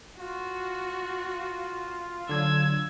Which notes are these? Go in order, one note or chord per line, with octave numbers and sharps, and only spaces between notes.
F4 F#4
D3 F#3 E6 G#6